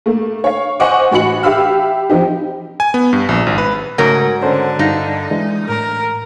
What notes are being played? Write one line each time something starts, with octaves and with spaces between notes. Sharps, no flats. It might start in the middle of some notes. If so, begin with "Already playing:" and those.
A3 A#3
C#5 F5
C5 D#5 F#5 G#5 C#6 D6
A1 F#4 B5 C#7 F#7
G4 E5 F5 B5 E6 F6
F3 C4 D#4 G4
G#5
B3
G2
A#1
G#1
B4
G#2 C#3 F#3 A3 A#4 G#6
D3 C#4 A4 C5
G2 D#4 F5
E3 G#3 D4
A2 A#4 A#5